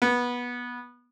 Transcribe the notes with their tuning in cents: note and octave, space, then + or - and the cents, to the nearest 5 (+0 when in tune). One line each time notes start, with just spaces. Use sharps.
B3 -15